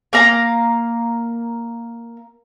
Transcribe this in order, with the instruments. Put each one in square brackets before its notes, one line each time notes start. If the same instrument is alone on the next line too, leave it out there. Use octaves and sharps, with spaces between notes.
[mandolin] A#3 F5 A#5